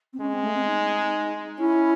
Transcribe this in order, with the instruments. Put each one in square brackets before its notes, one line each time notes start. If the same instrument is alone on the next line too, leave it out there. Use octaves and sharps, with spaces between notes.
[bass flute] C4
[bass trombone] G#3 [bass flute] C#4
[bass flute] C4
A3
C4
D#4
[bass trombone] C#4 [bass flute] E4